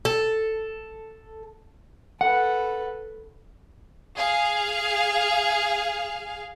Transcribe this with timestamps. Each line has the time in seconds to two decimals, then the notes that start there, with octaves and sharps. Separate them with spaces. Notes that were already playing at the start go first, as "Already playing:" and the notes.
0.05 A4
2.21 A4 B4 F#5
4.16 G#4 F5